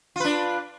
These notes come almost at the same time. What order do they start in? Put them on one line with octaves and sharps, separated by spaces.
F4 B4 D4